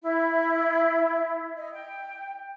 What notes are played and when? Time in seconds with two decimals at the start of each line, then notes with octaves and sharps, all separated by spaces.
0.03 E4
1.58 D#5
1.74 G5